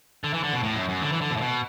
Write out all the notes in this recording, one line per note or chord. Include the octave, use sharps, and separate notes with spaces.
D3
E3
D3
B2
A2
F#2
F#2
D3
E3
D3
B2
A2
B2